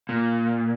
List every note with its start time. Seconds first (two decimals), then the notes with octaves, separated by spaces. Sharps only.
0.09 A#2